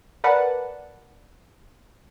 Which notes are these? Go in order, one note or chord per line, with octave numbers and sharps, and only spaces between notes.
A#4 B4 D5 F#5 A5